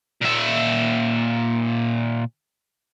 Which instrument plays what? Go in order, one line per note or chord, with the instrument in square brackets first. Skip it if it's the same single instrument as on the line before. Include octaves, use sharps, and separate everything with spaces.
[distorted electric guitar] A#2 E5